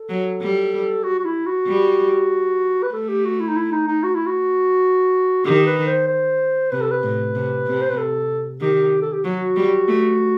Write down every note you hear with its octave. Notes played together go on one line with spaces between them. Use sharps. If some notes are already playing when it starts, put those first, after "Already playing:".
Already playing: A4
F#3
G3
F#4
F#4
E4
F#4
G3
B4
A3 A4
G4
F#4
E4
D#4
E4
D#4
D#4
F#4
E4
F#4
D#3 G4
B4
C5
C5
C3 B4
A4
B4
A2
C3
C3
C5
B4
A4
D#3 G4
A4
G4
F#3 F#4
G3
A3